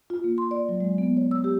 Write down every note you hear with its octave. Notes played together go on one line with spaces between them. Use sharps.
F4
A#3
C6
D5
F#3
G#3
B3
C#5
E6
G4